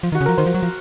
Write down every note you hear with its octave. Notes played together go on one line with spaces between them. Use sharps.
F3
D#3
F#4
C#3
F3 A#4
D#3 C5
F3
F#3
F3